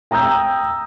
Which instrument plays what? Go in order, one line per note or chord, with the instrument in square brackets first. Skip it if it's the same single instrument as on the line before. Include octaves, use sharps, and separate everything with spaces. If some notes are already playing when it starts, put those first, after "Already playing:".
[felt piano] G5 A#5 D#6 E6 G6